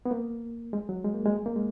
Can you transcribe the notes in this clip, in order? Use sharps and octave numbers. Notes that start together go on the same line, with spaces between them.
B3
A#3
G#3
F#3
G#3
A#3
G#3
A#3
G#3